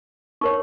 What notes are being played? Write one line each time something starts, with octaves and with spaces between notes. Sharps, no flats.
D#4 A#4 C#5 C#6